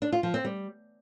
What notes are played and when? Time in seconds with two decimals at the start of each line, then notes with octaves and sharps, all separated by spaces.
0.02 D4
0.12 F4
0.23 F3
0.34 C4
0.45 G3